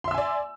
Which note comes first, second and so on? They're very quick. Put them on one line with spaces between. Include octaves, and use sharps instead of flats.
C6 E5 E6 G#5 D5